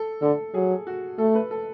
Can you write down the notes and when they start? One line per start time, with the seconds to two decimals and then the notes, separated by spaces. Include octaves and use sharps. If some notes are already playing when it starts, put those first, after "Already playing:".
Already playing: A4
0.22 D3 A4
0.54 F#3 G#4
0.87 F#4
1.18 A3 A4
1.35 B4
1.51 A4